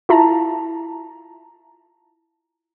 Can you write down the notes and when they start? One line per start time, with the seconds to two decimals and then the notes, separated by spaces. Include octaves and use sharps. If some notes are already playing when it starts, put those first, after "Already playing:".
0.09 E4 F4 A5 A#5